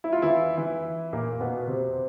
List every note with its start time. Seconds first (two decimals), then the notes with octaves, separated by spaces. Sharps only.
0.04 E4
0.13 F4
0.22 E3 E4
0.58 E3 E4
1.13 A#2 A#3
1.41 B2 B3
1.67 C3 C4